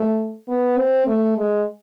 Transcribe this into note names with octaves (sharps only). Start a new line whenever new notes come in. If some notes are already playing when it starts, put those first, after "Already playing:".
Already playing: A3
B3
C4
A3
G#3